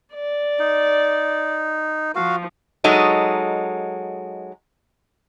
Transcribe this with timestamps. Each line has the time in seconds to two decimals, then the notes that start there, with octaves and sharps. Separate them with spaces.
0.14 D5
0.60 D#4
2.15 F3 F#4 F5
2.84 F#3 G#3 D#4 A4